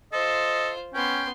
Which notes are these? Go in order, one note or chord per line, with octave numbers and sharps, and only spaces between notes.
F4 A4 C5 D#5
B3 C#4 G5 C6